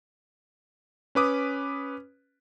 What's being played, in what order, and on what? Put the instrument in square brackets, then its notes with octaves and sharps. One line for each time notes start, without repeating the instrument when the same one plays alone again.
[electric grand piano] C#4 B4 D6 D#6